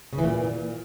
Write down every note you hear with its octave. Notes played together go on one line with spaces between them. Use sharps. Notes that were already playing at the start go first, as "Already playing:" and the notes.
C#3
E3
A#2